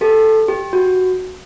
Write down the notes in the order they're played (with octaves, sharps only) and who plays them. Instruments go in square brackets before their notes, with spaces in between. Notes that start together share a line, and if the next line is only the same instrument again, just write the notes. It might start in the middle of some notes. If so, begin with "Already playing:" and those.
[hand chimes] G4 A4
G4
F#4